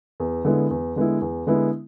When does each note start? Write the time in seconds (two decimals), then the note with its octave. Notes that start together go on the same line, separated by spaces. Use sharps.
0.20 E2
0.45 D3 G#3 B3 E4
0.71 E2
0.96 D3 G#3 B3 E4
1.21 E2
1.47 D3 G#3 B3 E4